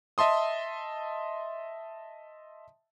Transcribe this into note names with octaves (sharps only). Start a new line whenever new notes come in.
D#5 E5 A5 C6 D#6